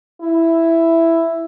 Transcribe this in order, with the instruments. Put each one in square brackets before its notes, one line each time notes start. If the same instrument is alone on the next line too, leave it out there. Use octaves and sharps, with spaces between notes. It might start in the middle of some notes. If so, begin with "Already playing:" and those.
[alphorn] E4